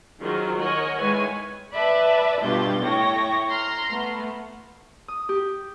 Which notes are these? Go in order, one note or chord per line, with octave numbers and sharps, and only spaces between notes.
D#3 F#3 F4 G#4 A#4 C5
A#4 C#5 D#5 F#5 G#5
D#3 G#3 E4 B4 C#5 G#5
B4 D5 E5 A5 B5
G2 B2 F4 G6 A6
A2 A3 C#5 G5 A#6
A#5 C6 F6
A3 B3
D#6
G4